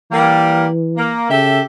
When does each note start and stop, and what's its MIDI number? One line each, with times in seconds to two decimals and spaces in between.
0.11 1.16 52
0.11 0.64 55
0.11 0.64 58
0.96 1.28 58
1.29 1.61 49
1.29 1.59 67
1.29 1.59 69
1.29 1.59 76